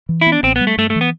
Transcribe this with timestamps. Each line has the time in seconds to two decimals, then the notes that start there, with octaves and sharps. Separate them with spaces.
0.09 E3
0.21 E4
0.27 B3
0.32 D4
0.43 A1 C4
0.56 B3
0.61 G3
0.67 A3
0.78 G2 A3
0.90 A3
0.96 E3
1.01 B3